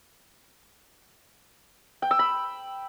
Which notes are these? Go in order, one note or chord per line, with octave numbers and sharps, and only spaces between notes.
G5
E6
B5